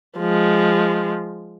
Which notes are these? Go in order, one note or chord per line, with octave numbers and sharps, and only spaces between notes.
F3 G#3